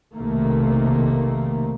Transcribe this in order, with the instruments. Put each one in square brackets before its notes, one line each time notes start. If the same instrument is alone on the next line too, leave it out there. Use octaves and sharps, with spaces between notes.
[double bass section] B1 C3 D#3 A3 A#3